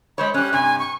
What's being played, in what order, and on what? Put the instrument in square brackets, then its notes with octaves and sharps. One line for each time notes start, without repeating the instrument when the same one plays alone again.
[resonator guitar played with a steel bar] G#3 C5 C#5 [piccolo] B5
[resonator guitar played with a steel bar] G3 C#4 [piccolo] F#6
[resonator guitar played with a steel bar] G2 C3 [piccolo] G#5
[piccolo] C#6